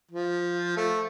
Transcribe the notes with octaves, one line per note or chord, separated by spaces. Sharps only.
F3
A3